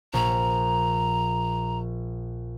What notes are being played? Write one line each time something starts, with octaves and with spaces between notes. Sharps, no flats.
A#1 A#5